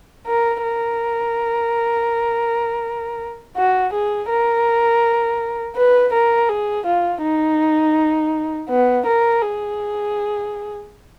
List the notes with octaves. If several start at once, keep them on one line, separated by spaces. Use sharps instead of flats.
A#4
A#4
F#4
G#4
A#4
B4
A#4
G#4
F4
D#4
B3
A#4
G#4